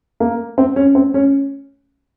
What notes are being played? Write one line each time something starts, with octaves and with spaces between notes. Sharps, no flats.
A#3
C4
C#4
C4
C#4